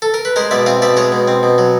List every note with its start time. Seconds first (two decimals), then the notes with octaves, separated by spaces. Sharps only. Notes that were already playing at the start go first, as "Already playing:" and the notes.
0.02 A4
0.14 A#4
0.25 B4
0.36 G#3 A#4 C5
0.51 B2 D5 E5
0.66 C4 D#5 F5
0.82 B2 D5 E5
0.97 G#3 C#5 D#5
1.12 B2
1.28 C4
1.43 B2
1.58 F#3